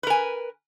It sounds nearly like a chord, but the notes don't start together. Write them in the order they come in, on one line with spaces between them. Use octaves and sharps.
B4 A#4 G#5